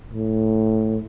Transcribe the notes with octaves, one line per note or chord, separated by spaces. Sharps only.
A2